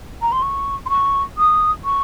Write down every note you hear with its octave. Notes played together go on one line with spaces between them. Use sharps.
A#5
C6
C#6
C6
C#6
D#6
C#6